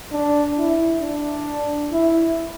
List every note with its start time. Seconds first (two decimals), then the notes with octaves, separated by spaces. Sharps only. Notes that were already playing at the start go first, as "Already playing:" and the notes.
0.12 D4
0.58 E4
1.02 D4
1.92 E4